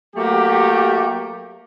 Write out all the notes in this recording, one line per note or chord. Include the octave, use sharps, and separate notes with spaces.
F#3 A3 A#3 G4